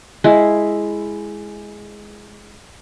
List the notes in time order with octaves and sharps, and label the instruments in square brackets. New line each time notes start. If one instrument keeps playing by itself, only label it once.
[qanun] G#3 E4